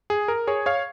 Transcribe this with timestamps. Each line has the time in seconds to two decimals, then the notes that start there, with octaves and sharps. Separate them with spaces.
0.10 G#4
0.28 A#4
0.47 G#4 C#5
0.66 C#5 F5